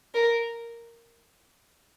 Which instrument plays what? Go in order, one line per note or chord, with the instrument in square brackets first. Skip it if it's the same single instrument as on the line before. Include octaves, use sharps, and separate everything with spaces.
[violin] A#4